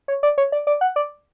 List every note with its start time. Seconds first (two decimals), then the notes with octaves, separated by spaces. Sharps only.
0.08 C#5
0.23 D5
0.38 C#5
0.52 D5
0.67 D5
0.81 F#5
0.96 D5